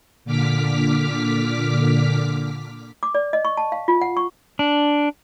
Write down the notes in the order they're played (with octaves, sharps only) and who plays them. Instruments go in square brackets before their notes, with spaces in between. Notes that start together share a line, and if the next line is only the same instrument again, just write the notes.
[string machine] A#2 D3 D6 F6 B6
[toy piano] D6
D5
D#5
C#6
A5
F5
F4
F#5
C#6
[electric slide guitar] D4